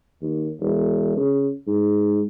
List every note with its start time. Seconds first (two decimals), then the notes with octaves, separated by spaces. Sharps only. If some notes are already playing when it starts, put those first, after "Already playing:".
0.22 D#2
0.60 E1
1.17 C#3
1.67 G#2